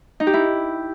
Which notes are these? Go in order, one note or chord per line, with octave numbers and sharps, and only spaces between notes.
D#4
G4
E4